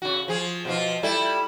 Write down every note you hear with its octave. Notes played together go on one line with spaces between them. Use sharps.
C#3 F#4
F3 G#4
B2 F3 F4
G3 E4 A4